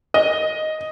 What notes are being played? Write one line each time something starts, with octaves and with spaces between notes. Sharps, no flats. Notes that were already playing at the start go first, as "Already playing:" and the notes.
D#5